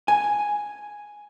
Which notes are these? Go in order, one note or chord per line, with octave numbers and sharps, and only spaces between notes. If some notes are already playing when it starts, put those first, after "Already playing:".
G#5